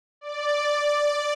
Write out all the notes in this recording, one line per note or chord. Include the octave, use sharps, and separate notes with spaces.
D5